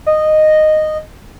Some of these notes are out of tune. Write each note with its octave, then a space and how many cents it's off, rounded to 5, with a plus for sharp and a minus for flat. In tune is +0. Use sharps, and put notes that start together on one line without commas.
D#5 -10